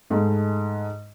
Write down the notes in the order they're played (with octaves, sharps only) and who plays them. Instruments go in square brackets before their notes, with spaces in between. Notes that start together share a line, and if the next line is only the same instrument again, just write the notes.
[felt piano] G#2 G#3 A3